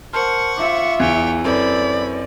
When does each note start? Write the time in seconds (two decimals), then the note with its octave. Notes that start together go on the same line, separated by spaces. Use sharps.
0.13 A#4 C5 F#5 A5 C#6 F6
0.57 F4 E5 D6
1.00 E2 E3 C#5 G5
1.44 F#2 C4 E4 A4 B4 D5 B5